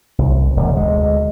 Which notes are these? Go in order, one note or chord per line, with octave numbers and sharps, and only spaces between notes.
C2
E1 D2
D2 G#3